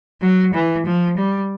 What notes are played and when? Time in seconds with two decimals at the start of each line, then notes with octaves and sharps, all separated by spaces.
0.22 F#3
0.54 E3
0.86 F3
1.17 G3